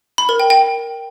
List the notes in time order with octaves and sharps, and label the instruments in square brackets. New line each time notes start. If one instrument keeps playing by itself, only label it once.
[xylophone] B5
A#4
G5
G5